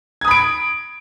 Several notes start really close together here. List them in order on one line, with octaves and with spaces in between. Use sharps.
G#6 D#6 B5 D7